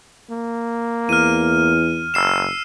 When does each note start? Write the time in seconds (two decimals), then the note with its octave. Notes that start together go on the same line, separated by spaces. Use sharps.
0.30 A#3
1.09 E2 F6 D#7
2.14 F#1 E6 C7 E7